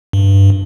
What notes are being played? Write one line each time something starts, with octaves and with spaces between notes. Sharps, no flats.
G2